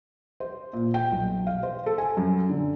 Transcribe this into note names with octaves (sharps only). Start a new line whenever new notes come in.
C5
A#2
G5
B1
F5
C5
A4
G#5
F#2
D3